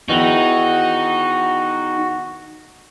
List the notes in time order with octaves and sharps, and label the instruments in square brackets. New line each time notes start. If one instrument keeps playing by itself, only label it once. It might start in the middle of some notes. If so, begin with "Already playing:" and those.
[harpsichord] E2 D#3 E4 [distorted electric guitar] D#4 [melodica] F#4